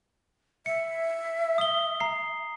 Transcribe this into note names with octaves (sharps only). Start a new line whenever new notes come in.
E5 C#7
D#6 G7
A#5 C7